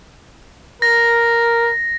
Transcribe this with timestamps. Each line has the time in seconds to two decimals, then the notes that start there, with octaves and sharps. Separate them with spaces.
0.82 A#4 A#6